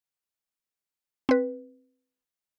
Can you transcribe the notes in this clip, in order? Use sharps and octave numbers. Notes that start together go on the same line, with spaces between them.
C4 B4